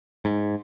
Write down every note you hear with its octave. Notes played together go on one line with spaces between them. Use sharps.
G#2